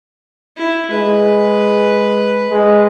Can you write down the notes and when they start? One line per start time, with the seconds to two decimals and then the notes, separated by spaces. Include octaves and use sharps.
0.56 E4
0.91 G#3 B4
2.50 G#3